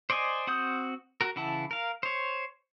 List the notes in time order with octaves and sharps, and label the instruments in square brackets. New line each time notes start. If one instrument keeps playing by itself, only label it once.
[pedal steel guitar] C5 D5 D#5 G#5
C4 F#4 F#5 D#6 G6
F#4 A#4
C#3 E3 E4 F#5 A5
A#4 F5
C5 C#5